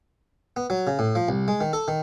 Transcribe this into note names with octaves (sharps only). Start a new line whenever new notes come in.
B3
F#3
C#3
A2
F3
C2
G#3
D#3
A4
D#3